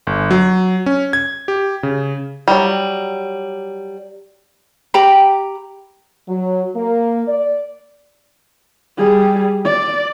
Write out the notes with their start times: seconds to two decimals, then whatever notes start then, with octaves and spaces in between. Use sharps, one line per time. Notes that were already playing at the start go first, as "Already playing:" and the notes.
0.07 G1
0.31 F#3
0.86 C#4
1.13 G#6
1.48 G4
1.83 C#3
2.48 F#3 G3
4.94 G4 G5 A#5 B5
6.28 F#3
6.75 A#3
7.28 D5
8.97 G3 G#4
9.65 D5